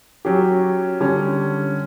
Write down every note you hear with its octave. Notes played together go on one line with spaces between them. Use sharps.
F#3 C#4 G4
D3 G3 C#4